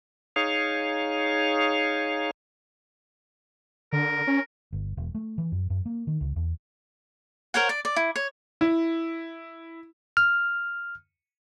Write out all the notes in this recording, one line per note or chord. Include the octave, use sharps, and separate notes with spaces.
D#4 G#4 C#5 F5
D3 A#4
C#4
G1
E1
A3
E3
F#2
F#2
A#3
D#3
C#2
E2
A#4 C5 C#5 F#5
D5
D5
E4
C#5
E4
F6